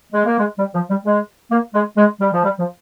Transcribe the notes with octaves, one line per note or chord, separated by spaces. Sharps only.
G#3
A#3
G#3
G3
F3
G3
G#3
A#3
G#3
G#3
G3
F3
G3
F3